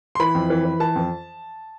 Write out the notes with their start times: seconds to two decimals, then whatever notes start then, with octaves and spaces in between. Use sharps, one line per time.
0.15 C6
0.20 E3 B5
0.35 F2
0.50 E3
0.65 E3
0.80 E3 A5
0.96 F2